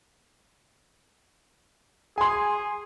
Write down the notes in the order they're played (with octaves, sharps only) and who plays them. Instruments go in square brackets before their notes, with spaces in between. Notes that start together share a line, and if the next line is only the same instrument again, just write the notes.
[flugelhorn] G#4 [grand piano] G#5 C6